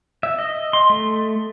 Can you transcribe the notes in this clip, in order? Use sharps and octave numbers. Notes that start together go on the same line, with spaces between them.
E5
D#5
C6
A3